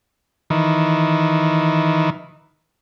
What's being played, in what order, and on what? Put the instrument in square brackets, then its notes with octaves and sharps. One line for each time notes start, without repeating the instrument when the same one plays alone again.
[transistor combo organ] D#3 E3